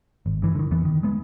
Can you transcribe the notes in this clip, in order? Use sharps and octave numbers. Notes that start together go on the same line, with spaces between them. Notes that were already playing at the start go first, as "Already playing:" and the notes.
G#1
G2 E3
D3 D#3
E2 E3 B3
D#3
G#3 B3